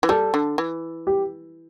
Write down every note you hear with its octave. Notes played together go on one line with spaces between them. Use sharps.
E3
G3 A4
D3
E3
G4